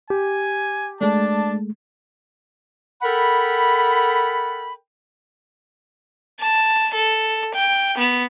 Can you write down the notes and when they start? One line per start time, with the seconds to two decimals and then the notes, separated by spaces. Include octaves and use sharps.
0.10 G4 G#5
1.01 G#3 A3 D4 A5
3.03 A4 A#4 F#5 G5 B5
6.40 A5
6.94 A4
7.55 G5
7.98 B3